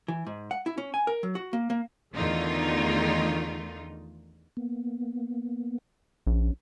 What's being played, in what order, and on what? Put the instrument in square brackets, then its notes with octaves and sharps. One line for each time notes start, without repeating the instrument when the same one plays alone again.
[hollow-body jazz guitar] E3
G#2
F#5
E4
C#4
G#5
A#4
F#3
F#4
A#3
A#3
[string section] E2 D3 D#3 A3 D#4 F4
[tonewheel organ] A#3 B3
[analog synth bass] A#1 [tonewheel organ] C#4